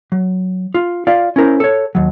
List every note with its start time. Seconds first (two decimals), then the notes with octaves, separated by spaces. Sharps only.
0.12 F#3
0.74 F4
1.07 F4 D5 F5
1.36 C#4 E4 A#4 C5
1.60 A4 C#5
1.95 D#2 F#3